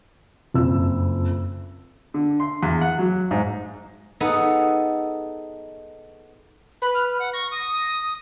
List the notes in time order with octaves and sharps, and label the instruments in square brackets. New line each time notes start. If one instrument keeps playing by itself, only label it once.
[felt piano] F#1 F2 E6
[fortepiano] D3
C6
E2
F#5
F#3
G#2
[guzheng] B3 D#4 G#4 A4 B4
[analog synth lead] B4 [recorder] B5
[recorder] F6
F#5
[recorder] C#6 [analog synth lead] A#6
[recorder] D#6